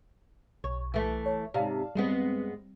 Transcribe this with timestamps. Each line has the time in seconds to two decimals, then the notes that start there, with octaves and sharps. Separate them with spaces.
0.64 B1 C#5
0.94 E3 A3
1.26 C#5
1.54 G#2 C3 D5 F5 A5
1.95 G2 G3 G#3 B3 C4